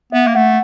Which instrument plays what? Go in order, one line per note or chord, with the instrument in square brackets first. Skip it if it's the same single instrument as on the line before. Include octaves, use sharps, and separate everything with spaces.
[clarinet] B3 [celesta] E5
[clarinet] A#3
[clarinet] A3 [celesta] F#5